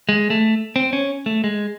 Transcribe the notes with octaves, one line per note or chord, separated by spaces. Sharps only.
G#3
A3
C4
C#4
A3
G#3